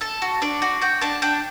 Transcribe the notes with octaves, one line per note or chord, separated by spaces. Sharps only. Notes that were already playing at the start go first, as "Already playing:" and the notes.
A4 A5
F#4
D4 D5
F#4
F#4 G5
D4 A5
D4 G5